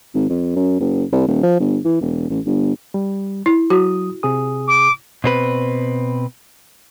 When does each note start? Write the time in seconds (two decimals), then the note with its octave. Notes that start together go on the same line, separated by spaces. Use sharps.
0.14 G#1
0.29 F2
0.56 F#2
0.80 F#1
1.12 C2
1.28 D#1
1.43 F3
1.60 G1
1.85 E3
2.01 E1
2.30 A1
2.46 G1
2.94 G3
3.46 E4
3.70 F#3 F#4 D#6
4.23 C3 G#4 D#6
4.68 D6
5.24 B2 C4 B4